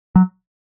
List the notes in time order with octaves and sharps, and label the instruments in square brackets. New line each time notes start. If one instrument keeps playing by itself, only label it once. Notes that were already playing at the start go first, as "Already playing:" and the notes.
[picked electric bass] F#3